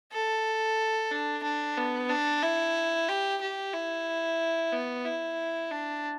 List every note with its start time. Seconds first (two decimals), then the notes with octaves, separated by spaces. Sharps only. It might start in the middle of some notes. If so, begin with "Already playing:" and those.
0.13 A4
1.11 D4
1.43 D4
1.77 B3
2.09 D4
2.42 E4
3.09 G4
3.41 G4
3.74 E4
4.73 B3
5.05 E4
5.71 D4